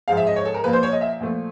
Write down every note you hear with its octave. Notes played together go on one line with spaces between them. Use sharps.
G#2 F3 G#3 F5
E5
D#5
C#5
A4
A#4
A#2 F3 A#3 B4
C5
C#5
D#5
E5
A#2 F3 A3